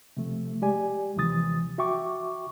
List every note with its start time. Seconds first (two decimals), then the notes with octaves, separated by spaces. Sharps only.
0.17 C3 F3 A3
0.62 G#3 G4 D5 G#5
1.16 D#2 C3 E3 F3 D#6 A6
1.78 F#4 E5 G5 C#6 D6